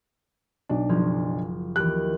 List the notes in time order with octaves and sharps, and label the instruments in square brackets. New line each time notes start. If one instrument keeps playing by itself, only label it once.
[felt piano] B1 D4
[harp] F#1 F3 G#6
[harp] D#2 E3 G4 [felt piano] F#6